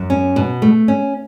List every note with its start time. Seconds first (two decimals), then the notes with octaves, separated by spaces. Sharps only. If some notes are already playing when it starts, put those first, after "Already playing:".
Already playing: F#2
0.10 C#4
0.36 B2
0.62 A3
0.88 C#4